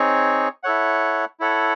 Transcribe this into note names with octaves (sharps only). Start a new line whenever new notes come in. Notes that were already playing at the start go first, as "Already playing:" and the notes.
Already playing: C4 D#4 G#4 C#5
E4 A4 C#5 F#5
E4 A4 C#5 F#5